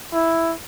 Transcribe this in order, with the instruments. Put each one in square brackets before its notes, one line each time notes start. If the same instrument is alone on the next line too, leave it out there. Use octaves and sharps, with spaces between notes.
[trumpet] E4